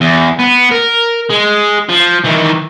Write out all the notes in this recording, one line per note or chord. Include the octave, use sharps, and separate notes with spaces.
E2
B3
A#4
G#3
F3
D#3 E3